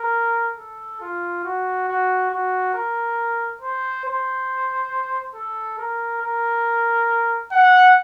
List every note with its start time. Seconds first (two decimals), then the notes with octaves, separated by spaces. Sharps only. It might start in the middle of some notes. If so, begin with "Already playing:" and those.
Already playing: A#4
0.57 A4
1.01 F4
1.44 F#4
1.88 F#4
2.31 F#4
2.74 A#4
3.61 C5
4.05 C5
5.35 A4
5.78 A#4
6.22 A#4
7.52 F#5